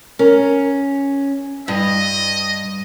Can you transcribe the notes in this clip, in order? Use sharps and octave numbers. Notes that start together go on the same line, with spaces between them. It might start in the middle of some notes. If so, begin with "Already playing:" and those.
C#4 A#4
G2 D#5